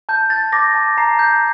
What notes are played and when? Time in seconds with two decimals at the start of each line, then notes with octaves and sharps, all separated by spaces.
0.09 A5 G6
0.30 G6 A6
0.52 D6 A#6
0.75 A5
0.97 A#5 C7
1.19 G6